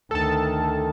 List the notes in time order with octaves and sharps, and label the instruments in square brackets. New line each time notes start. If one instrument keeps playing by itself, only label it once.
[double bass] D2 D#3 [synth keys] A4 A5